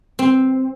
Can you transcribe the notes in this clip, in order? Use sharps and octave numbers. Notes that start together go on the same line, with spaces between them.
C4